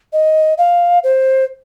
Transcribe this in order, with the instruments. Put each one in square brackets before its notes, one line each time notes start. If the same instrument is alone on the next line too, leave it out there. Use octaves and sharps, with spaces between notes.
[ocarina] D#5
F5
C5